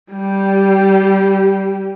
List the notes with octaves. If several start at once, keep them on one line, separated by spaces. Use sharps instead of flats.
G3 G4